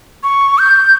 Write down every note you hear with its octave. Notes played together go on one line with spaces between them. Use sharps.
C#6
G6